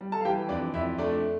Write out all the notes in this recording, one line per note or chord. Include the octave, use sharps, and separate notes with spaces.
G3
A4 A5
F5
E3 G4 G5
F2 D4 D5
F2 E4 E5
A3 D4 D5